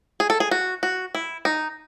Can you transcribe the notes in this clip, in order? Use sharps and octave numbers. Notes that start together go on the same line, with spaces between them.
G#4
A4
G#4
F#4
F#4
E4
D#4